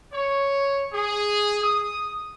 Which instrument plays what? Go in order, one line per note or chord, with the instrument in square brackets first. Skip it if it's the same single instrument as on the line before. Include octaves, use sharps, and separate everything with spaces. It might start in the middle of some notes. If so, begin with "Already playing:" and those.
[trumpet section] C#5
G#4
D#6